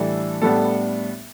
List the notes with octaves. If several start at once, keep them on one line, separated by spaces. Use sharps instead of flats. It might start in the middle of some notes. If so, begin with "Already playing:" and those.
Already playing: A2 E3 G3 D4 A4
A2 G3 B3 D4 A4